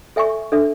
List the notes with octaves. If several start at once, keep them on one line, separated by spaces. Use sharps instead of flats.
A4 E5 G#5 C#6
D4 A4 E5